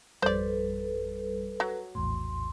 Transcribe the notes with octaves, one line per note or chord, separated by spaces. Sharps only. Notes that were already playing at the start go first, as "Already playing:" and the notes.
G#1 F2 G3 A4 B4 C5 D5
F#3
A#1 E2 A2 C6